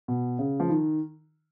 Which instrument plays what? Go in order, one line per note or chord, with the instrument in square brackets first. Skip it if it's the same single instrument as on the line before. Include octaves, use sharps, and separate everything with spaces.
[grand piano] B2
C#3
F3
D#3